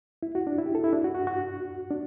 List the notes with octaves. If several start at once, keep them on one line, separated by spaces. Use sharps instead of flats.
E4
F#4
D4
E4
G4
A4
E4
D4
F#4
F#4
F#4
D4